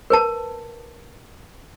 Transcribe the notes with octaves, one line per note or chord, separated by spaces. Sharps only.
A#4 B4 A5